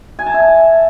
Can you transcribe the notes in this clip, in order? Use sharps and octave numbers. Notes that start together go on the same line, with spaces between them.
G#5
A5
E5